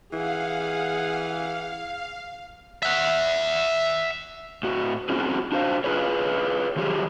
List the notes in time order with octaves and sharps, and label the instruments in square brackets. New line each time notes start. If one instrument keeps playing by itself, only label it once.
[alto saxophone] E3 [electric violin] G#4 F#5 [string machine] F5
[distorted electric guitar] E5 F#5
[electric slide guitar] A2 F#4
C4 C#4 F4 F#4 G#4
D4 F#4 C5 F5
F4 G#4 B4 C#5
D#3 F3 F#3 G4 G#4